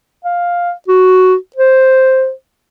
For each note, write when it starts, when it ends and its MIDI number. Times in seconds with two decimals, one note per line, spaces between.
0.25 0.71 77
0.88 1.35 66
1.56 2.31 72